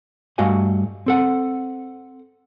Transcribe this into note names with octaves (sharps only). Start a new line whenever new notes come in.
G2 A3 F#4 D#5 F5 G#5
C4 A4 F#5